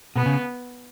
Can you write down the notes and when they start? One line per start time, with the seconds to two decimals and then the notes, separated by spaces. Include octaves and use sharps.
0.16 B2 B3
0.26 C#3